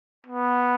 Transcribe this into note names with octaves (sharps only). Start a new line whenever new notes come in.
B3